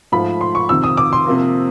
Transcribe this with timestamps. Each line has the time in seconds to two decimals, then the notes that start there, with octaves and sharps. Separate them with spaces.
0.12 G#2 F3 A3 B5
0.41 C6
0.55 C#6
0.69 F2 C3 D#3 E6
0.84 D#6
0.97 D6
1.13 C6
1.26 C3 F3 A#3